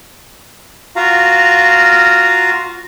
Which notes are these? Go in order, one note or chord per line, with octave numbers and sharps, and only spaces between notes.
F4 F#4 F5 A#5